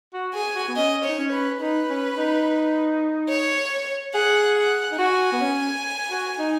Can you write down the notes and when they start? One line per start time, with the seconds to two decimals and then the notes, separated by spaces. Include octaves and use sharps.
0.13 F#4
0.34 G#4 G#5
0.55 F#4
0.68 B3
0.76 C#4 D#5
1.04 D#4 C#5
1.18 C#4
1.32 B4
1.61 D#4 B4
1.89 C#4
2.17 D#4
3.29 C#5
4.14 G#4 F#5
4.56 F#5
4.92 D#4
4.98 F#4 G#5
5.32 B3
5.40 C#4
6.11 F#4
6.39 D#4